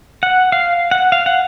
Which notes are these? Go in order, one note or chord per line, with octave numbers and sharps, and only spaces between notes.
F#5
F5
F#5
F5
F#5